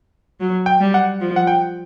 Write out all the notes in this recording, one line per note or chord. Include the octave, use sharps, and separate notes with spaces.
F#3
G5
G3
F#5
F3
F#5
G5